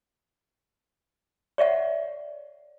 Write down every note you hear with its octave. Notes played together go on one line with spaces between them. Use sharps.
C#5 D5 E5 F#5